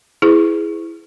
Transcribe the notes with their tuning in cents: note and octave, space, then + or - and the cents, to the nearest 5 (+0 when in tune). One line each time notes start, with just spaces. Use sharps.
E4 +0 G#4 +0 B4 +30